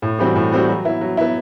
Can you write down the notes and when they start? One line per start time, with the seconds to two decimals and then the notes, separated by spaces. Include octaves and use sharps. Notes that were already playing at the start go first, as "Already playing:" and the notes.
0.02 A2
0.19 E3 G3 C4 F#4
0.36 A2
0.52 E3 G3 C4 F#4
0.68 F#3
0.85 B3 E4
1.01 F#3
1.17 B3 E4